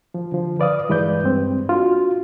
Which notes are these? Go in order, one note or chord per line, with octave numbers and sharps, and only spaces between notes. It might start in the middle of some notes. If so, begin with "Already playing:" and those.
F3
D3 F3
B4 D5 F5 D#6
G2 E3 G#3 B4 D5 G6
G2 C4
D4 F4 F#4